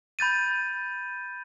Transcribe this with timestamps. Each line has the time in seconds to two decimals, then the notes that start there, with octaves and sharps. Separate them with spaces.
0.19 B5 G6 A6 D#7